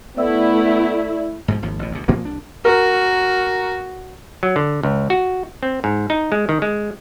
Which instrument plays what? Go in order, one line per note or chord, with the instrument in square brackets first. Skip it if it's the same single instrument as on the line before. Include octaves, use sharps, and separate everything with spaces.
[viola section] A3 E4 [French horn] B3 [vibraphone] D5 E5 E6
[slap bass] G#2 B2 F3
G#1 D#2 F3
A1 B2
D2 B2
A#2 F3 A#3 B3
C2 D4
[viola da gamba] F#4 [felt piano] A#4
[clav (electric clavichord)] F#3
D3
C#2
F#4
C4
G#2
D#4
G#3
D#3
G#3